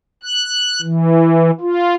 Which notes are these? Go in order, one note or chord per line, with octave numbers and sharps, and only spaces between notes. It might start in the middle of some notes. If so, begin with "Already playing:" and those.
F#6
E3
F4